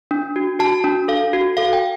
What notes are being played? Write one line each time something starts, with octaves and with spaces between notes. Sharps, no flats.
D4
F#4
F#4 A5
D4
A4 F5
F#4
A4 F5
G5